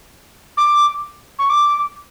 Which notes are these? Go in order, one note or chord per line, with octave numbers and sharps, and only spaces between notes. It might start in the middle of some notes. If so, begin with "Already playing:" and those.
D6
C#6
D6